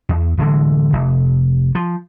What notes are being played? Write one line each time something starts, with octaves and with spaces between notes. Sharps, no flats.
E2
D1 D3 E3 G#3
F1
F3